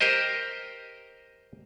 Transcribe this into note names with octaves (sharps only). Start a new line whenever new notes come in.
G4 A#4 C5 D#5